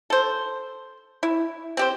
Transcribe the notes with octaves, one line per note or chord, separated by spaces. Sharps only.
A4 C5
E4
C4 G4 C5